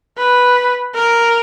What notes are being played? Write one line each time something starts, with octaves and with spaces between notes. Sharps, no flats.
B4
A#4